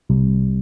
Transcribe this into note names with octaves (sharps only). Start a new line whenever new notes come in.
C2 C3 G3